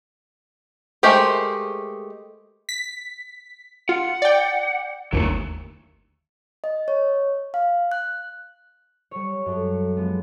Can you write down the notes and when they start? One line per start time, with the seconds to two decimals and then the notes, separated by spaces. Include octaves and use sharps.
1.03 G#3 A3 G4 A#4 C5
2.69 B6
3.89 F4 F#5
4.22 D5 G5
5.13 G1 D#2 F#3 A3
6.64 D#5
6.88 C#5
7.54 F5
7.92 F#6
9.11 G3 C#5
9.46 F#2 A4
9.97 F3 G#3 B3